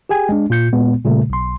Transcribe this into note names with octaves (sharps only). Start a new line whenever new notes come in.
G4 G#4 G5 G#5
G#3 D4
A#2 F4 G6 C#7
A#2 G#3 B3
A#2 C#3 G3 A3
B1 C6